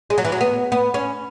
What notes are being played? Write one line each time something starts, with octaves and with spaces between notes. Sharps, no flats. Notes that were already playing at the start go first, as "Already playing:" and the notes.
G#3
F#3
E3
F#3
B3
B3
C#4